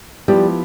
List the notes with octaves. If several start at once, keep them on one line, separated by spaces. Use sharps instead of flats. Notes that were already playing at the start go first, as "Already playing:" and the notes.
F3 G3 B3 E4 G4